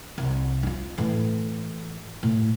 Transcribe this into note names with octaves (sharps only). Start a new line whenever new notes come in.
C2
E4 F4
A2 E3
A2